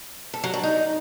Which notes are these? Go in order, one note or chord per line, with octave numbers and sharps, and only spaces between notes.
A4
F#3
D4
D#4